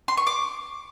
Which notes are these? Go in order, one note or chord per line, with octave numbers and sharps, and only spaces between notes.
C6
C#6
D6